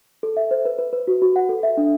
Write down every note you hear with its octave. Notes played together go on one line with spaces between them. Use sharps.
A4
E5
C5
B4
B4
B4
F#4
F#4
F#5
A4
E5
D4